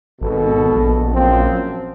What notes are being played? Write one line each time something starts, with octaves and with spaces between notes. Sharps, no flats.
G#1 B2 A4
A#1
F#2 F3 C4